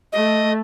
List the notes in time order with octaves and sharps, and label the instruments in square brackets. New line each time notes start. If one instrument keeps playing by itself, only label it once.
[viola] A3 [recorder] D#5